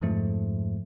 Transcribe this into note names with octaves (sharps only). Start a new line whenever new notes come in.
F2 G#2 F3 A3